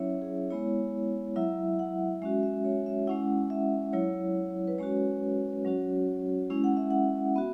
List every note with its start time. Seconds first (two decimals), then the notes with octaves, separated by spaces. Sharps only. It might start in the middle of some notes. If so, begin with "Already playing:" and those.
Already playing: F#3 C#4 E4 C#5 E5
0.22 G#4
0.50 G#3 B3 E4 C#5
1.36 F#3 E4 E5
1.79 F#5
2.22 G#3 C#4 F#4 E5
2.43 E5
2.65 C#5
2.86 E5
3.07 G#3 C#4 E4 F#5
3.50 E5
3.93 F#3 E4 C#5
4.68 B4
4.78 G#3 C#4 F#4 C#5
5.64 F#3 C#4 F#4
6.50 G#3 C#4 E4
6.64 F#5
6.77 E5
6.91 F#5
7.36 B3 F#4 E5